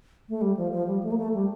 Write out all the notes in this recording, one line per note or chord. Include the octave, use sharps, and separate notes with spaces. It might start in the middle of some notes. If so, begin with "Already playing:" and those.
A3
G3
F3
F3
G3
A3
A#3
A3
G3